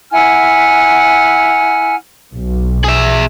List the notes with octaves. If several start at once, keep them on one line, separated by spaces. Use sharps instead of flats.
E4 F#5 G#5 F6
B1
G#4 E5